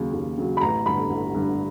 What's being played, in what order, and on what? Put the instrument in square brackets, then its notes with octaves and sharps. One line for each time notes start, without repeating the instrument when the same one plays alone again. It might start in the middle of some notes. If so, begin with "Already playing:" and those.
Already playing: [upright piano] D#2 C#3 F#3
D#2
C#3 F#3
B5
A1 A#5
G2 D3 B5
A1
G2 D3